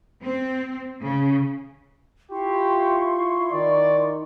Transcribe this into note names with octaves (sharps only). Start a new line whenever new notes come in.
C4
C#3
E4 F4 G4 C6 C#6
D#3 D5